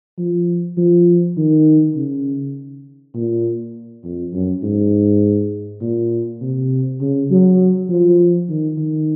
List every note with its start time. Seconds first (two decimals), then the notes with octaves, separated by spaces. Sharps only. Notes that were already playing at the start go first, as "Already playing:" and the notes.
0.18 F3
0.77 F3
1.37 D#3
1.96 C#3
3.15 A#2
4.04 F2
4.33 F#2
4.63 G#2
5.81 A#2
6.41 C3
7.01 C#3
7.30 F#3
7.89 F3
8.49 D#3
8.78 D#3